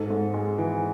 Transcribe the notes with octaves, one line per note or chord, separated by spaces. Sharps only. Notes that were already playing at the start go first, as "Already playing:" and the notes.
Already playing: G#2 A4
G#2
G#3
E3